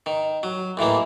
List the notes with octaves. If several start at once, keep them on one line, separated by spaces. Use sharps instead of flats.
D#3
F#3
D#2 A2 E3 A#3